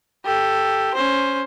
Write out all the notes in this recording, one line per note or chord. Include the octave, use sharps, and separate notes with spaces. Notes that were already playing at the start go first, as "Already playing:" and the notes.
G4 A4
C#4 C5